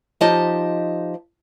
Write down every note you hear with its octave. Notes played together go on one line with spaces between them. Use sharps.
F3 D#4 G4 C5 D#5 A5